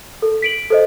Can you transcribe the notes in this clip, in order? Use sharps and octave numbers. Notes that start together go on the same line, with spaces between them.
A4
B6 D7 F#7
A4 C5 D#5